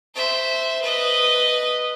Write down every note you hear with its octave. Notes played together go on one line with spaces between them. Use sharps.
C5 E5
B4 D#5